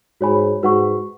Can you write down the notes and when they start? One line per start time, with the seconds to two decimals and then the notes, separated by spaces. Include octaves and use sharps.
0.21 G#2 F#4 C#5 G#5 B5
0.63 G#2 F#4 B4 F#5 C#6